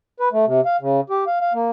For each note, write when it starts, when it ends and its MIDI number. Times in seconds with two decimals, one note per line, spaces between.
0.20 0.29 71
0.33 0.45 57
0.46 0.61 48
0.66 0.76 77
0.81 1.00 49
1.10 1.24 67
1.27 1.39 77
1.41 1.53 77
1.54 1.71 58